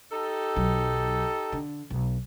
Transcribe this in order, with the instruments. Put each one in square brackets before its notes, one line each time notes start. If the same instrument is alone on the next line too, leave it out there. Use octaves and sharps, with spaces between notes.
[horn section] D#4 G4 A4
[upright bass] B1 F#3
D3
B1